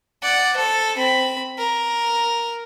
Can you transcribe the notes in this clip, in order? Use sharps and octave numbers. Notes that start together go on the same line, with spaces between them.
D5 F#5
A4 C5
C4 B5
A#4